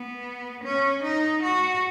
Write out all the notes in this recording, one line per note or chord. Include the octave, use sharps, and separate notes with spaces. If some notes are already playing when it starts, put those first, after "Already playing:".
Already playing: B3
C#4
D#4
F#4